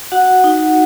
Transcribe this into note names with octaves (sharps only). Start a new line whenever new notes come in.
F#4 F#5
D#4